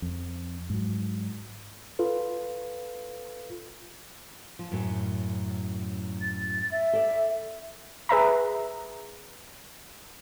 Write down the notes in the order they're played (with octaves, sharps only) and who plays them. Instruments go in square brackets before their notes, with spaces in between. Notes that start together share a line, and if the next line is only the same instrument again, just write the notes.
[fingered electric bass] F2
G#2 F#3
[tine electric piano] F4 A4 B4
[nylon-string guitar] F3
F#2 A2 F#3
[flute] A6
E5
[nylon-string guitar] A4 D5
[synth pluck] G#4 B4 E5 A#5